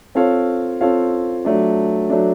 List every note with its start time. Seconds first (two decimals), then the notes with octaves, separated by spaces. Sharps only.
0.15 C4 F4 A4 C#5 F5
0.81 C4 F4 A4 C#5 F5
1.45 F#3 A3 D4
2.10 F#3 A3 D4